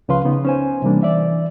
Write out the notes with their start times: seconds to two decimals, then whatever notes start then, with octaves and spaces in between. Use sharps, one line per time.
0.08 C#2 C#3 F3 B4 F5 C6
0.24 C#3 B3 D#4
0.45 C#4 C5 G#5
0.82 C3 E3 G3 A#3 D4
1.03 E3 D5 E5